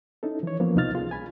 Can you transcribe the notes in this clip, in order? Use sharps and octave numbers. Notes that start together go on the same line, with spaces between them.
C#4 D#4 E4 A4
E3 C#5
F3 A#3 B3 C#4
C2 B2 D#4 F4 F6 A6
F4 G#4
G#5 B5